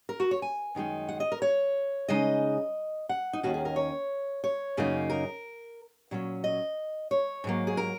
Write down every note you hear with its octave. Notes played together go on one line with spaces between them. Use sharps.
A#4
F#4
C#5
G#5
F#2 D#3 G#3 D#4
F#5
D#5
A#4
C#5
C#3 G#3 D#4 D#5
F#5
D#4
D#2 D#3 A#3 C#4 F#4
G#4
A#4
C#5
C#5
F#2 C#3 A#3 D#4
A#4
A#2 F#3 C#4
D#5
C#5
G#2 F#3 A#3
G#4
A#4